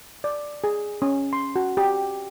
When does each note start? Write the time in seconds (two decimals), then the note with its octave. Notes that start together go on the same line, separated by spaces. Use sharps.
0.24 D5
0.64 G#4
1.02 C#4
1.33 C6
1.56 F#4
1.77 G4